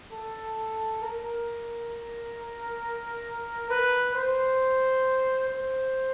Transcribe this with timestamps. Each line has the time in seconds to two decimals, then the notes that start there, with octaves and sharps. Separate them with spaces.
0.12 A4
1.02 A#4
3.70 B4
4.15 C5
5.50 C5